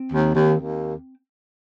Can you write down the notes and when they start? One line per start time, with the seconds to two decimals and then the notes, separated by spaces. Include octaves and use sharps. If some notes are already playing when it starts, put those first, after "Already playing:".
Already playing: C4
0.12 D#2
0.35 D#2
0.59 D#2